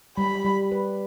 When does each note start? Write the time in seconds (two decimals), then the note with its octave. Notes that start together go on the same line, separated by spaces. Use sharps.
0.18 G3 B5
0.45 G3
0.72 B4